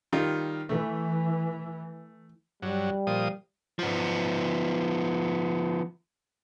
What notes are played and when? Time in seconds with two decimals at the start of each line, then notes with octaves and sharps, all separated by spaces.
0.13 D#3 G3 F4
0.69 E3 A3
2.62 G2 F#3 G3
3.07 A#2 F3 D#6
3.79 F3 B3